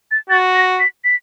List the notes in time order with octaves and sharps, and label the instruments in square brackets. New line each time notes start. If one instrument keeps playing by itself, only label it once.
[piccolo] A6
[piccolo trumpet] F#4 [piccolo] A6
[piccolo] A#6
B6
B6